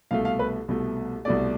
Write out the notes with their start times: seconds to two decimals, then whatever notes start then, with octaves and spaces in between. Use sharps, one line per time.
0.11 C2 B2 A3 F5
0.25 F5
0.39 B4
0.68 C2 B2 A3
1.25 C2 B2 A3 D5